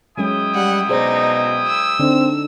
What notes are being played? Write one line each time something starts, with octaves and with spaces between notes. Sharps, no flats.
F#3 G#3 C#4 E4 G5 D#6
G3 F#5
B2 D#4 G#4 C5 D5
E6
D3 C4 D4 D#4